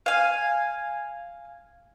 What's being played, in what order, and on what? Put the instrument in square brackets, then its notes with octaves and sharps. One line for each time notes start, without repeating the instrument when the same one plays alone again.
[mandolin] F5 G#5